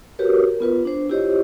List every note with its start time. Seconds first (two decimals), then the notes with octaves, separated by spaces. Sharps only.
0.19 F#4 G4 A#4 B4 C#5
0.48 A#4
0.60 B3 F4 B4
0.85 D4 C5
1.10 E4 F4 G4 C5 C#5 D#5